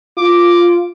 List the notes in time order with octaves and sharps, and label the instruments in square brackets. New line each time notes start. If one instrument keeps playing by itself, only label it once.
[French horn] F4 [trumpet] D6